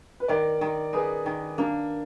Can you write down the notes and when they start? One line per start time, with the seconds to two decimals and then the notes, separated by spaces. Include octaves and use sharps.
0.20 B4
0.28 D#3 A#4 D5
0.61 D#3
0.93 D#4 G#4 B4
1.26 D#3
1.58 A#3 D4